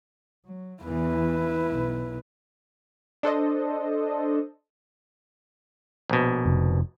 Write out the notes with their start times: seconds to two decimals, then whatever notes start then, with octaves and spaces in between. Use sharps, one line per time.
0.46 F#3
0.83 E2 E3 E4 B4
1.69 B1
3.23 D4 A4 C5 D#5
6.10 A#1 B2
6.45 F1